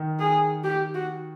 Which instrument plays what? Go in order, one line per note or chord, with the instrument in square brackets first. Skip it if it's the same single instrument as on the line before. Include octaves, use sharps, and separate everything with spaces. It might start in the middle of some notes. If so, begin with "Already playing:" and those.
Already playing: [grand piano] D#3
[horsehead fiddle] G#4
G4
F#4